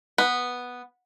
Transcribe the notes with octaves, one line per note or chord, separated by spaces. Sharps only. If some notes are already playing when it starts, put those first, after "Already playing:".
B3